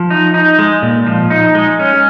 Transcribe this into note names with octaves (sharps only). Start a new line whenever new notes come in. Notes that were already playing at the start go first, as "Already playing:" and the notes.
Already playing: F3
D#4
D#4
G#3
A#2
F3
D#4
G#3
C#4